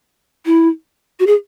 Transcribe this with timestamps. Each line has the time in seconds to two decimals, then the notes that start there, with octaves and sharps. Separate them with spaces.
0.46 E4
1.20 F#4
1.27 G#4